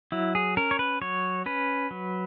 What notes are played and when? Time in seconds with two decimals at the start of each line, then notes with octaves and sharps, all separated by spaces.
0.12 F#3 E4
0.35 G#4
0.57 C#4 A#4
0.71 C#5
0.79 B4
1.01 F#3 C#5
1.46 C#4 B4
1.91 F#3